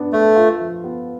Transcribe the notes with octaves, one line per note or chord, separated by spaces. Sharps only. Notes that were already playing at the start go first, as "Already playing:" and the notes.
Already playing: B3 D4
A3 A4
F4
F3
B3